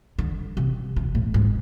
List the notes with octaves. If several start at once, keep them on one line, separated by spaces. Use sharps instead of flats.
D3
C3
C3
A2
G#2